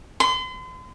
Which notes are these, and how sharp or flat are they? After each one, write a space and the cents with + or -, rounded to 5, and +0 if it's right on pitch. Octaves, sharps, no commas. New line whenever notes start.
C6 -40